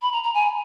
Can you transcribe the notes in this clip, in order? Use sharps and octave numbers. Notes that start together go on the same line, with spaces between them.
B5
A#5
A#5
G#5